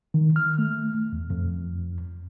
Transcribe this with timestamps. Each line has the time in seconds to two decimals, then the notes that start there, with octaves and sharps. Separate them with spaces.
0.14 D#3
0.36 F6
0.58 A3
1.13 E2
1.30 F2